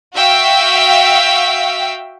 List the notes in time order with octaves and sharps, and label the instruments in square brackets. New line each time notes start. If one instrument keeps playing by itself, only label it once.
[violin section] F#4 E5 F5 G5